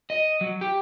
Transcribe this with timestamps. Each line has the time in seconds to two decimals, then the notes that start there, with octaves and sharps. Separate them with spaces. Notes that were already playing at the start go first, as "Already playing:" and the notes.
0.10 D#5
0.41 F#3
0.61 G4